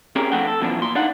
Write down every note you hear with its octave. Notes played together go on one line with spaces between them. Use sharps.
C4 C#4 G4 G#4 A#4 D5
F3 A3 C4 D4 F#5 G5
A4
F#2 B2 E3 F3 D4
A#2 C6
D4 D#4 D5 F5 F#5